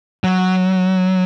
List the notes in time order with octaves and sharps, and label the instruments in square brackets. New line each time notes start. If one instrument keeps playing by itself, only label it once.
[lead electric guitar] F#3